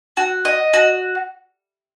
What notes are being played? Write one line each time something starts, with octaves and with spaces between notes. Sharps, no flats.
F#4
D#5
F#4